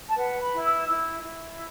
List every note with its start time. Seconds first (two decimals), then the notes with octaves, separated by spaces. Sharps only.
0.09 A5
0.16 B4 F#5
0.39 B5
0.51 E4
0.64 E6
0.88 E4
1.23 E4